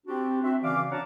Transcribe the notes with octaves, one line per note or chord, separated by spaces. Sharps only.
C4 D4 F#4 G4
C4 F#4 E5
C#3 E3 C#4 D5 F5 D6
D4 F#4 C#5 F#5 A5 A#5